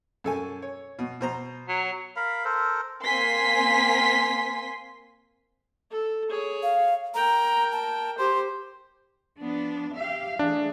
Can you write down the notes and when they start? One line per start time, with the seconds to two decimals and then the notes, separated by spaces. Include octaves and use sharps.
0.24 F#2 A4 G#5
0.62 C#5
0.99 B2
1.21 B2 C5 A#5
1.69 F#3
2.16 A#4 F5 B5
2.45 A4 A#4 C5
3.04 A#3 C4 G#5 C6 B6
5.91 A4
6.30 G#4 C#5
6.63 F5
7.14 A#4 G5 A#5
7.72 A5
8.18 G4 C5 C6
9.38 F3 B3 D4
9.96 G4 E5 F5
10.39 E3 A3 D4 G#4